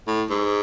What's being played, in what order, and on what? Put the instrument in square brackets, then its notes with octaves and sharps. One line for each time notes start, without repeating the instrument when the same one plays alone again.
[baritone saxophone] A2
G#2